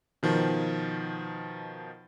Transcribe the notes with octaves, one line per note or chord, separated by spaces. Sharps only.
B2 D#3 F3